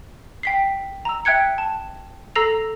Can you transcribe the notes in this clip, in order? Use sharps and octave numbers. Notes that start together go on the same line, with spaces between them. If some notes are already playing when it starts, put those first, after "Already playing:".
G5 B6 C7
A#5 E6
E5 G5 F#6 G#6 C#7
A5
A4 A#5 E6 A#6 C7 F7